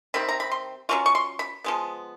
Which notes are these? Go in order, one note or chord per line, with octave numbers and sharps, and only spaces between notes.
C3 D#3 G3 C4 B5
A#5
B5
C6
F#3 A#3 C#4 F4 C#6
C#6
C6
B5
F3 G#3 B3